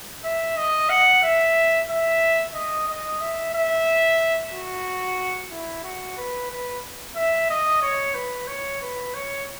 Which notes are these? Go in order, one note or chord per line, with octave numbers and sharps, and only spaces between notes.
E5
D#5
F#5
E5
E5
D#5
D#5
E5
E5
F#4
E4
F#4
B4
B4
E5
D#5
C#5
B4
C#5
B4
C#5